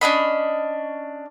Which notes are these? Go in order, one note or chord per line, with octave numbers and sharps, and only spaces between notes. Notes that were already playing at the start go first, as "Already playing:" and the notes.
C#4 D4 D#5 B5